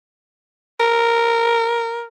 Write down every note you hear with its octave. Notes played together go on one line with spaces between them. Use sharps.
A#4